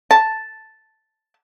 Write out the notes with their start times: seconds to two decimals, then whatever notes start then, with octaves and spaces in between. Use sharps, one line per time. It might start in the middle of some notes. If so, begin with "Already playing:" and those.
0.11 A5